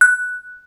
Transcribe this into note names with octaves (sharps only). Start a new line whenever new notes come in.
F#6